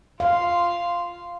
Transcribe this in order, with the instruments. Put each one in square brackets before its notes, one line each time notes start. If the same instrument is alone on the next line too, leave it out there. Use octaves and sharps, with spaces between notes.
[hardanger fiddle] F4 C6 [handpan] F5